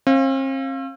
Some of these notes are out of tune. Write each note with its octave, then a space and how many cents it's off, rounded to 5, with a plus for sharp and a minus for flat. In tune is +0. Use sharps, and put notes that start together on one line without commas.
C4 +45 F5 +0